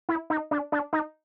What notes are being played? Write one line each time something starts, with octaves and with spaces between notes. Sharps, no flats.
E4
D#4
D4
D4
D#4